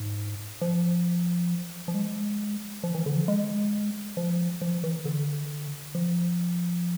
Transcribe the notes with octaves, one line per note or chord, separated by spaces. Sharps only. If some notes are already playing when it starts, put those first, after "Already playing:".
Already playing: G#2
F3
F3
G#3
F3
E3
D3
F3
G#3
F3
F3
E3
D3
F3